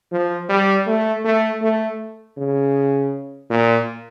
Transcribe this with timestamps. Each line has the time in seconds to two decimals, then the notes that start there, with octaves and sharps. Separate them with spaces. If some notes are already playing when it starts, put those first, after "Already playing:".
0.12 F3
0.49 G3
0.87 A3
1.25 A3
1.62 A3
2.38 C#3
3.50 A#2